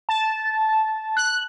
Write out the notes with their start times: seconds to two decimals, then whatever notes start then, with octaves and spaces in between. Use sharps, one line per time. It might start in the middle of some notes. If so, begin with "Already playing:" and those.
0.09 A5
1.17 F#6